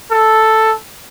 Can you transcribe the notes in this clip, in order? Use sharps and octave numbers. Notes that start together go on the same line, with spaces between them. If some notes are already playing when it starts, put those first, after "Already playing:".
A4